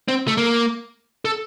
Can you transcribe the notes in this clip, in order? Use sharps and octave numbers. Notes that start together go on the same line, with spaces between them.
C4
A3
A#3
A4